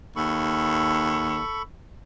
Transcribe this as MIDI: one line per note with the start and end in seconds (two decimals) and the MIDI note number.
0.16 1.40 39
0.16 1.62 69
0.16 1.62 83
0.16 1.62 85